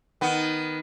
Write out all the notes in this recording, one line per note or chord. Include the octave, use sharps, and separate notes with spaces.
D#3 B3